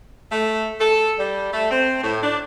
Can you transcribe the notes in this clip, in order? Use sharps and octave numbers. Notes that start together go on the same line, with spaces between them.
A3
A4
G3
A3
C4
A2
D4